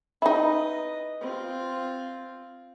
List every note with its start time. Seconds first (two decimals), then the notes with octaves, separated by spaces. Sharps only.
0.22 D#4 E4 B4 D#5
1.21 C4 F4